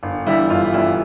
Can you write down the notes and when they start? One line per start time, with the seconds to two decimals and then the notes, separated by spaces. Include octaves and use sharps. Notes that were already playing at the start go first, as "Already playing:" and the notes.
0.03 G1
0.27 G2 E3 G3 E4
0.50 G1 F4
0.74 G2 E3 G3 E4